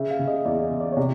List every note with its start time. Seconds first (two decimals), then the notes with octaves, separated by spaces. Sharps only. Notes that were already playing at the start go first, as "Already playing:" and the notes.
Already playing: C#3 E5
0.11 F5
0.19 C#3
0.28 D#5
0.45 E2 D5
0.71 C#3
0.80 D5
0.92 C3 C#5